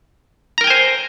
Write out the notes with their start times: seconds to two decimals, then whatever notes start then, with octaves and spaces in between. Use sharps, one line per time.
0.58 A#5
0.61 A#4
0.64 G5
0.67 G#5
0.70 C5